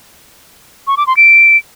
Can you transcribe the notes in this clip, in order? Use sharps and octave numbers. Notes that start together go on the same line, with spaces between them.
C#6
D6
C6
D7